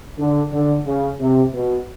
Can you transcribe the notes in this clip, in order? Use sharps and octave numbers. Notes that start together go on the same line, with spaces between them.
D3
D3
C#3
C3
B2